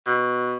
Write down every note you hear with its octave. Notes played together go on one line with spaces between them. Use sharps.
B2